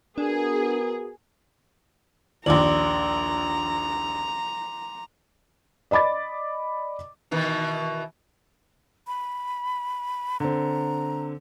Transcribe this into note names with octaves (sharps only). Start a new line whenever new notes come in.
B3 D4 F#4 G#4 A#4
A#1 D#2 D5 A#5 C6 D6 F#7
D5 D#5 B5 D6 A6
B2 D#3 E3
B5
D3 C4 A#5